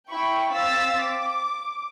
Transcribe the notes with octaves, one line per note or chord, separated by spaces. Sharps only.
E4 G5 B5 C#6
C4 F5 E6 A6 B6
D6